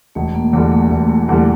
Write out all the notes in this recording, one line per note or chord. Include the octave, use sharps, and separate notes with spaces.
E1 A3
A#3
E2 D3 G3 A3
A3
E1 A3
A3
E2 D3 G3 A3